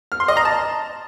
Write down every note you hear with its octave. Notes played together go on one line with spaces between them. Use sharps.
F6
C6
D#5
A#5
A5